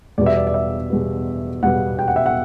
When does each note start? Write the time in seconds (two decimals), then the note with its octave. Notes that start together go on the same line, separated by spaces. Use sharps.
0.18 E2 B2 G3 B3 D5
0.26 E5
0.36 D5
0.47 D5
0.54 E5
0.90 E2 B2 G3 B3
1.62 E2 B2 G3 B3 F#5
1.99 G5
2.08 F#5
2.16 E5
2.26 F#5